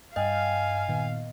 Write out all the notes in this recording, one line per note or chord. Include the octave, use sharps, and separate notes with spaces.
G2 D#5 F5 G5 G#5 F6
A#2 D#3 B3